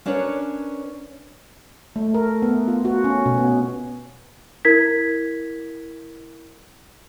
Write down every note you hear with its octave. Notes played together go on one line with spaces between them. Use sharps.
C#4 D4 A#4 B4 C#5
A3
A#4
B3
F4
F#4
C#4
B2
B3
E4 A#4 G#6 B6